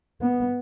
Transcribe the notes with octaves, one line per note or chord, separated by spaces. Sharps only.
B3